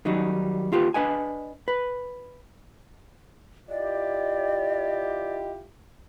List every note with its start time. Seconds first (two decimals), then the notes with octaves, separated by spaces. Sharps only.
0.05 D#3 F#3 G3 D#4
0.72 D#2 F4 G4 B4
0.94 D4 B4 D#5 G#5
1.68 B4
3.69 E4 F4 G4 D5 D#5